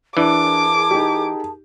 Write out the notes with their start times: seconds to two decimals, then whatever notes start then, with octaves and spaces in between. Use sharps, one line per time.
0.17 E3 D4 G#4 A#4 A5 D6
0.91 D#4 G4